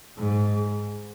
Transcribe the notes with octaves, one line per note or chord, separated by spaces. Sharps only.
G#2